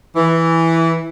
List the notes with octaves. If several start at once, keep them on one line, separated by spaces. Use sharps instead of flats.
E3